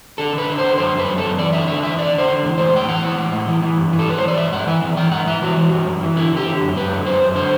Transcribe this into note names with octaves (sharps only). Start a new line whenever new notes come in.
D3 A4
D3 B4
D3
C5
D3
F#2 C5
F#2 B4
F#2
A4
F#2
E2 D5
D3 E5
D3 E5
E2 E5
D3 D5
D3
C5
D3
E2
A2 C5
A2 G5
E3 F#5
E3
A2
A2
E3
E3
G2
E3
A4
G2 B4
C5
E3 D5
G2 E5
G2 F#5
E3 E5
E3 D5
E3 G5
G2 F#5
E3 E5
E3 F#4
E3
G2
G2
E3
D3 E4
D3 G4
D3
F#2
F#2 B4
D3
F#2 C5
F#2
D3 C5